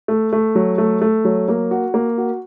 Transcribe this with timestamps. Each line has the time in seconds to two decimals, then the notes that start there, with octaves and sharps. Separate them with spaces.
0.08 A3
0.33 A3
0.55 F#3
0.78 A3
1.01 A3
1.25 F#3
1.48 A#3
1.71 F#4
1.94 A#3
2.18 F#4